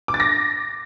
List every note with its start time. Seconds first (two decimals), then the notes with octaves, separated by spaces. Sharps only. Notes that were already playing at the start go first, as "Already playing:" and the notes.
0.08 D6
0.14 A6
0.20 A#6